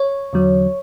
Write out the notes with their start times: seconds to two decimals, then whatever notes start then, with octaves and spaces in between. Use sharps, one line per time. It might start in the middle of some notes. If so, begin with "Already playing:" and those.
Already playing: C#5
0.33 E2 D3 F#3